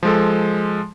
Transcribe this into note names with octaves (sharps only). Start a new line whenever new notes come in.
F3 G#3 A4